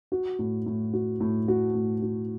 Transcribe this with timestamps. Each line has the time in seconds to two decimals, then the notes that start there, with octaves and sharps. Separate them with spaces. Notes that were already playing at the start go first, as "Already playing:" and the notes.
0.12 F#4
0.39 A2
0.66 A2
0.93 F#4
1.20 A2
1.48 F#4
1.75 A2
2.02 F#4